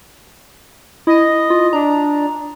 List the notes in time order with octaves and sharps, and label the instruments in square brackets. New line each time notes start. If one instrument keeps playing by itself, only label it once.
[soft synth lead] E4 [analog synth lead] D#5
[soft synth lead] F4
[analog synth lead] D4 [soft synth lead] A#5